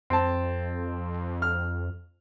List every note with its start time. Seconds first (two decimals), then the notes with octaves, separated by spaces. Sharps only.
0.10 F2 C4 A5
1.42 F6